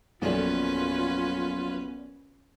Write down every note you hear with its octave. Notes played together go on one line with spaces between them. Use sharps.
A#1 F#2 B3 C#4 F4 A4 B4 D5